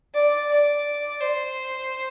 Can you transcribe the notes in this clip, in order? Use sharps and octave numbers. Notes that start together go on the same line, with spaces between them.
D5
D5
C5